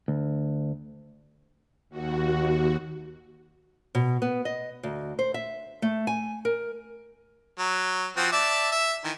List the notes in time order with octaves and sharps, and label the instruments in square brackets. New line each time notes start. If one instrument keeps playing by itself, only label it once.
[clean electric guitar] D2
[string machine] D#2 F#4
[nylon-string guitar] B2
B3
D#5
D2
C5
E5
A3
G#5
A#4
[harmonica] F#3
F3 C4 F#4
D5 E5 A5
E5
D#3 E3